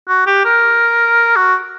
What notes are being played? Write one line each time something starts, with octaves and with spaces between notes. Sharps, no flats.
F#4
G4
A#4
F#4